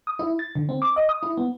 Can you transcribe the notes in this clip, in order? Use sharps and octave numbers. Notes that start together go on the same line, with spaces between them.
D#6
E4
A6
D3
C4
D6
D#5
D#6
E4
B3